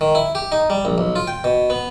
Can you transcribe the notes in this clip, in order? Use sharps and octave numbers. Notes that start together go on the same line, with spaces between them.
D#3
E4
G4
D#4
G3
A#1
B1
F4
G5
B2
B3